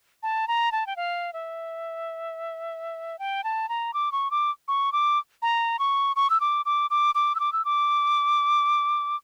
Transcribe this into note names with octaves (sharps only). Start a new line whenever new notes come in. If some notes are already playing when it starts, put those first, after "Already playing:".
A5
A#5
A5
G5
F5
E5
G5
A5
A#5
D6
C#6
D6
C#6
D6
A#5
C#6
C#6
E6
D6
D6
D6
D6
E6
D6
E6
D6